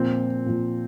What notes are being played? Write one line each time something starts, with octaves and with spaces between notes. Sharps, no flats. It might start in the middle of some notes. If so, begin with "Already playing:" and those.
Already playing: A#2 F3 C4
A#2 F3